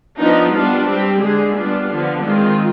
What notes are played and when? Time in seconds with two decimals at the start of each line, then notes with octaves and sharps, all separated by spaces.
0.19 F3 B3 D4 D#4
0.53 G3 B3 D4 F4
0.87 G3 C4 G4
1.21 D3 G#3 D4 G#4
1.56 G3 B3 D4 F4
1.90 D3 F3 B3 D4
2.24 D#3 G#3 C4 F4